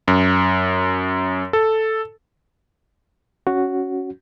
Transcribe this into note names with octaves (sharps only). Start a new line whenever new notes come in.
F#2
A4
C#4 F#4